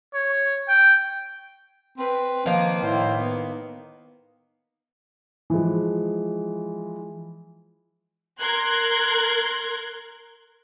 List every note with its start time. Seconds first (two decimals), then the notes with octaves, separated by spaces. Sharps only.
0.14 C#5
0.68 G5
1.98 C4 B4
2.46 D#3 F3 A#3
2.83 A2 E4 C5
3.16 B3
5.50 E3 F3 G#3
8.40 A#4 C6 F#6 G#6